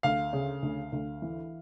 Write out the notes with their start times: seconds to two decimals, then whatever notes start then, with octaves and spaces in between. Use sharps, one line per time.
0.03 D2 F5
0.33 C#3
0.62 D2
0.92 D2
1.22 E3